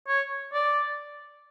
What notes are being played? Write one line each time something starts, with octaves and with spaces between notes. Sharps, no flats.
C#5
D5